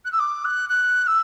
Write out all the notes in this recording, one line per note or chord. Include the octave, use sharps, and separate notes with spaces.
F#6
E6
D6
F#6
F#6
E6